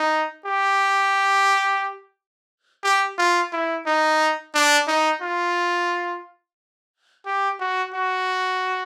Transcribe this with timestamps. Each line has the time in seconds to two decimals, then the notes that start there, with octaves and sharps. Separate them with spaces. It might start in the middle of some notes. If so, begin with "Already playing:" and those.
Already playing: D#4
0.46 G4
2.83 G4
3.18 F4
3.52 E4
3.86 D#4
4.54 D4
4.88 D#4
5.22 F4
7.26 G4
7.60 F#4
7.94 F#4